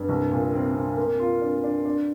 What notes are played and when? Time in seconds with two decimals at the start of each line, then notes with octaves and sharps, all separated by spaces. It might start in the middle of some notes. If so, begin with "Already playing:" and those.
Already playing: G2
0.09 C2
0.31 A#2
0.53 C4
0.76 C4
0.97 A#3
1.20 F4
1.41 D4
1.64 D4
1.85 D4